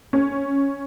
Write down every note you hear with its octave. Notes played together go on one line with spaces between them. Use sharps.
C#4